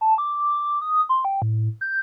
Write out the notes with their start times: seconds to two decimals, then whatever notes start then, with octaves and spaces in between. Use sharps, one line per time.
0.01 A5
0.18 D6
0.82 D#6
1.09 C6
1.25 G5
1.42 A2
1.81 G6